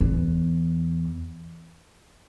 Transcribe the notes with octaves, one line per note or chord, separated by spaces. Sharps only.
E2